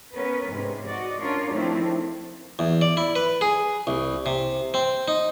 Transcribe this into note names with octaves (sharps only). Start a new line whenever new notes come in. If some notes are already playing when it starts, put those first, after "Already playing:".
B3 C#4 A#4 B4
G#2 C3
F#4 D5 D#5
C#4 D4 F4 A#4 C#5 D5
D#3 F3 A3 C4 D4 E4
E2
D5
E4
B4
G#4
C2
C3
C4
D#4